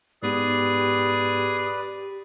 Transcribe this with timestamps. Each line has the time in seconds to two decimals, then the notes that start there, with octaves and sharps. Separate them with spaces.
0.23 G#2 B3 G4 G#4 B4 D5